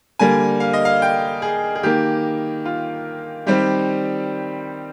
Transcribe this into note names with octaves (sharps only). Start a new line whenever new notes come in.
D3 G3 A#3 G#5
F5
D#5
F5
G5
G#4
G#4
D#3 A#3 G4
F4
D#3 G3 C4 G4